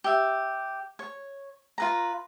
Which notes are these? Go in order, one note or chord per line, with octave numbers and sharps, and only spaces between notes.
G4 E5
C#5
F4 B4 A#5